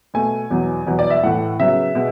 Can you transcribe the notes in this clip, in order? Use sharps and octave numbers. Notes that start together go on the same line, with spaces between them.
B2 A3 G#5
E2 B2 F#3
E2 B2 F#3 B3
D5
E5
A2 E3 A3 F#5
C#3 F#3 B3 E5
B2 G#3 B3